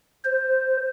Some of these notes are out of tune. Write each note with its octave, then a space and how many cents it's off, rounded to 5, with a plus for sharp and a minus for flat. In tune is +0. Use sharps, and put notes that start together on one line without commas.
C5 +0